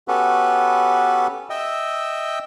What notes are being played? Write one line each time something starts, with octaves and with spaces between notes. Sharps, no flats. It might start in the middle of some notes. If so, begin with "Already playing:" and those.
B3 C#4 F#4 G4 A4 B4
D#5 E5 G5 E6